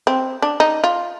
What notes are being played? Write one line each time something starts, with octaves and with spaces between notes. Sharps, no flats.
C4
D4
D#4
F4